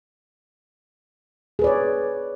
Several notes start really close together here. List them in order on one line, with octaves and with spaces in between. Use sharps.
G#4 B4 D5 C#5